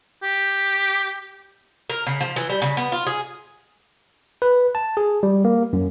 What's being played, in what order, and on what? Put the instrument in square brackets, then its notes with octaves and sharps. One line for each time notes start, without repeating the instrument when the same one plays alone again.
[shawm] G4
[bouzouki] A#4
C#3
F3
E3
G3
C#3
B3
F4
G#4
[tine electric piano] B4
A5
G#4
G3
A#3
F#2